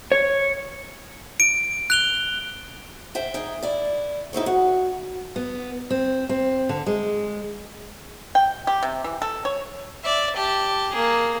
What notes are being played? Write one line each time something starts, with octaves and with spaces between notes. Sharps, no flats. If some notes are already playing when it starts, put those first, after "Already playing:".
C#5
D7
F#6 F7 G7
C5 E5 G5
D#4 G#4 G5
E4 D5
D#4 E4 C5 C#5
F#4
B3
C4
C4
D3
G#3
G5
G4
C3
E3
A4
C#5
D5 E5
G4 A5
A#3 G#4